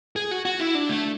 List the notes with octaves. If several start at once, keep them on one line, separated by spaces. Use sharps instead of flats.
G#4
F#4
F#4
E4
D4
A3